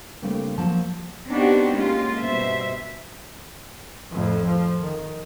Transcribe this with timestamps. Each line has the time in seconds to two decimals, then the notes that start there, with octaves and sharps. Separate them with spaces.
0.22 C#3 G3 A3 A#3 C4 D4
0.58 F3 F#3 A#3 A5
1.30 B3 C4 D4 D#4 F#4 G4
1.75 G#3 A#3 C#4 F4
2.18 G2 B2 C5 E5
4.11 F2 A2
4.45 F3
4.81 D#3